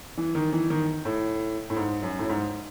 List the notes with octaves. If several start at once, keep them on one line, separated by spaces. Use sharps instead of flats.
E3
D#3
E3
D#3
A2
A2
G#2
F#2
A2
G#2